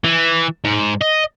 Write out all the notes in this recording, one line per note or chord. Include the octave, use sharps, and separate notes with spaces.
E3
G#2
D#5